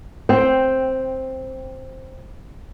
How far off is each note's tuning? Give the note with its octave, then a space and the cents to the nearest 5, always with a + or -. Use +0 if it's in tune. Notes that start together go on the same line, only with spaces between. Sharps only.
C4 +5 G5 +0